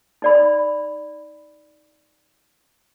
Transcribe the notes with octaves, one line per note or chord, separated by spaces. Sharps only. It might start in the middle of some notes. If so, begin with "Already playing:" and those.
D#4 D5 B5